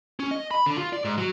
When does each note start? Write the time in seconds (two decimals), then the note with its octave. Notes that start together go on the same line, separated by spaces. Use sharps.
0.20 C#4
0.31 D#5
0.51 B5
0.66 D3
0.78 F4
0.93 D5
1.05 G#2
1.18 F#3